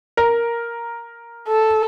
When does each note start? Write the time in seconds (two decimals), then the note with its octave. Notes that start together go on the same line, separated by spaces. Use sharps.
0.17 A#4
1.48 A4